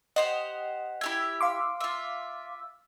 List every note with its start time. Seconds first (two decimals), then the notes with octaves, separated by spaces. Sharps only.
0.16 G4 C5 D#5 F#5
1.01 E4 G4 E5 G#6
1.41 F5 C6 D6
1.81 F4 E5